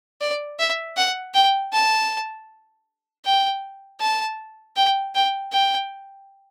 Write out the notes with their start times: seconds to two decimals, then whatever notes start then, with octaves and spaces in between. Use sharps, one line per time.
0.21 D5
0.59 E5
0.97 F#5
1.34 G5
1.73 A5
3.25 G5
4.00 A5
4.76 G5
5.15 G5
5.52 G5